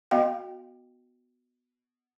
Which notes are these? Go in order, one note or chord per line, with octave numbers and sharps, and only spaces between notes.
B3 F#4 D#5 F5 G5